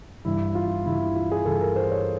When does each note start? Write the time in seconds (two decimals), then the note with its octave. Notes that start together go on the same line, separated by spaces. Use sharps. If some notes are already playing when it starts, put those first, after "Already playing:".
0.25 G2 E3 G3 E4
0.55 F4
0.86 G2 E3 G3 E4
1.01 E4
1.16 F4
1.31 G#4
1.45 G2 E3 G3 A4
1.61 A#4
1.76 C5
1.91 C#5